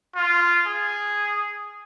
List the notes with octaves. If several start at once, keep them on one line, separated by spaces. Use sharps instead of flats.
F4
G#4